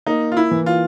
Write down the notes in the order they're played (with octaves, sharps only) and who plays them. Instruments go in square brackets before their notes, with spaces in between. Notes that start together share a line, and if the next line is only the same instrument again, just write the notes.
[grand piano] A#3 [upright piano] D#4
[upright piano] F4
E4
[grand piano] E3
[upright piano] F4